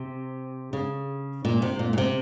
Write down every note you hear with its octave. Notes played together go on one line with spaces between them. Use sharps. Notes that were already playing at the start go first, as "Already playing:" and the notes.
Already playing: C3
C#3
A#2
C3
A#2
A#2
C3